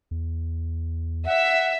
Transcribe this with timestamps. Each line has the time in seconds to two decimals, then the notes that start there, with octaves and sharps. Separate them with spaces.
0.11 E2
1.26 E5 F#5